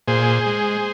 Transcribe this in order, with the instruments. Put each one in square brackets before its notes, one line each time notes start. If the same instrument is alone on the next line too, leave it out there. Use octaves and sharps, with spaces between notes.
[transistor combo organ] A#2 G#4 C5
G#3